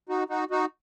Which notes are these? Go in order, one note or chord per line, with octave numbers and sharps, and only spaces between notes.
D#4 F#4
D#4 F#4
D#4 F#4